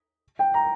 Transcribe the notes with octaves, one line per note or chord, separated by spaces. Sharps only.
G5
A#5